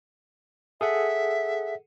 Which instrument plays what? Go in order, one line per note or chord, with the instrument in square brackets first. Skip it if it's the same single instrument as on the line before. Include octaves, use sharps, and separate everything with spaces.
[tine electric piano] G#4 A4 F#5 [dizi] E5